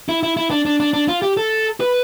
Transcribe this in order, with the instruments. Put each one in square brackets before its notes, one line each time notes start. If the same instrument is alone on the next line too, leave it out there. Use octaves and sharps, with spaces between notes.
[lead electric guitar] E4
E4
E4
D4
D4
D4
D4
F4
G4
A4
B4